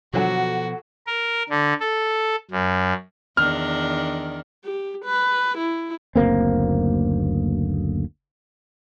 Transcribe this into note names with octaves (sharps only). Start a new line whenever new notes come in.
B2 D3 F3 F#3 F#4 A4 F#5
A#4
D3
A4
F#2
E2 D#3 D4 F6
G4
B4
E4
F#1 D2 A#3 C4